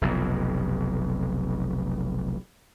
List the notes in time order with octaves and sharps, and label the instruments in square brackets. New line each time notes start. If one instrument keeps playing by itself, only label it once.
[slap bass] F1 B1 F2